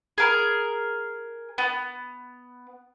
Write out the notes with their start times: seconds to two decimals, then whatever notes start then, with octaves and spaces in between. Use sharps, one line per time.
0.18 G#4 A#4
1.58 B3